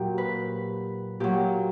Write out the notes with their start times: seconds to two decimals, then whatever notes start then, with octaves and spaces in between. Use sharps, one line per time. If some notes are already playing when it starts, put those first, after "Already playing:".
Already playing: A#2 F#3 G4
0.18 B4
1.20 A#2 F#3 G4